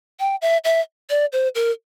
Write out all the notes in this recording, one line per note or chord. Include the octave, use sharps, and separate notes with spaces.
G5
E5
E5
D5
C5
A#4